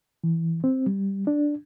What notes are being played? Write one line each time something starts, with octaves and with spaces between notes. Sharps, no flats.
E3
C4
G3
D4